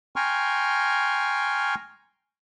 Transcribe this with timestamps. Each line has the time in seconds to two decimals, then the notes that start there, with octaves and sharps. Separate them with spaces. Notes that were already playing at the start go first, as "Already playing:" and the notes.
0.16 G5 G#5 A#5 C6 C#6 F6